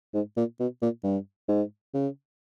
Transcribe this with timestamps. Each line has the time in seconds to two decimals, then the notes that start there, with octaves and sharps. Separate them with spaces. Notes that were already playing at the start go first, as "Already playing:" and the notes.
0.14 G#2
0.37 A#2
0.60 B2
0.82 A#2
1.04 G2
1.48 G#2
1.94 C#3